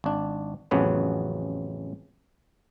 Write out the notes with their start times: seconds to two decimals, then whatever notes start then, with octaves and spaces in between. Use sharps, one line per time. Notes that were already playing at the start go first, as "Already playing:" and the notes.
0.04 G#1 D4
0.71 A1 F2 C#3 F#3 B3 F#4